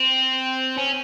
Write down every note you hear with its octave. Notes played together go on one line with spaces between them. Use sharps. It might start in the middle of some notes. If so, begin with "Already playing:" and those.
Already playing: C4
C#4